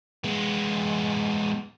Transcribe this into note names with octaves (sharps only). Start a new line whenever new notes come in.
G#3 B3